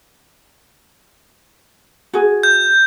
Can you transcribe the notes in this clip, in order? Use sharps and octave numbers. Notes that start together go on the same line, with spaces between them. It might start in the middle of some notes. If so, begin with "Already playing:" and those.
F#4 G#4
G6